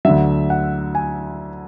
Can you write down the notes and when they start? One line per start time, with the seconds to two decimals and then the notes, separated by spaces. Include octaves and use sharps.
0.05 D2 D3 F#3 E5
0.50 F#5
0.95 G#5